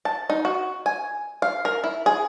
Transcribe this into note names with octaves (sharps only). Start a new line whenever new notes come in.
A5
D#4
F#4
G#5
F5
A#4
E4
G#4